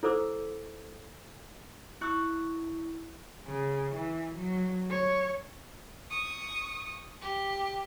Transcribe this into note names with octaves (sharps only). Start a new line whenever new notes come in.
E4 A4 C5 D6 E6
E4 C#6 E6 F#6
C#3
E3
F#3
C#5
C#6 D#6
G4